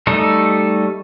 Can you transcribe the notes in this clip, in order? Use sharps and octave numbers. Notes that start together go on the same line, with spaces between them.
G3 A3 D#4 A4